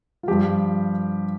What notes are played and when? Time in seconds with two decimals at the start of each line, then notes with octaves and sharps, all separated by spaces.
0.23 F4
0.28 G2 F3 G4